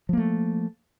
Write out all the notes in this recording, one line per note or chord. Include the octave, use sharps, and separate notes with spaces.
F3 A3 A#3